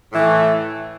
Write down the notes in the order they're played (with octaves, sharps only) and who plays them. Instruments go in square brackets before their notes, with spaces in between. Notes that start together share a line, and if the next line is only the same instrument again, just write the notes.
[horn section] A2 E3 A3